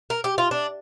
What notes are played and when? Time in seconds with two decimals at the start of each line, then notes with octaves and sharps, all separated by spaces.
0.10 A#4
0.24 G4
0.38 F4
0.51 D4